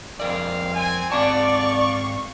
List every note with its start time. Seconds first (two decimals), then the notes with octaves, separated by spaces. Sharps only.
0.20 F2 G#3 C4 A#4 D5 F5
0.73 C4 G#5
1.12 G#2 C4 D5 F5 A5 C#6